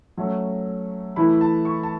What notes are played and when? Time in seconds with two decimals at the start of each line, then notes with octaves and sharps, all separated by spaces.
0.17 F#3 A3 C#4
1.16 E3 A3 E4 B5
1.41 A5
1.65 C#6
1.83 A5